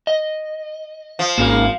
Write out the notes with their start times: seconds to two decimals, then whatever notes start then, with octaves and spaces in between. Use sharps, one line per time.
0.07 D#5
1.19 F3
1.38 G#1 A#3 C#4 A#4